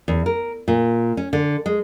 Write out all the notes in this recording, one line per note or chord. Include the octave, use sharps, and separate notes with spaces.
E2
A#4
A#2
C#4
D3
G#3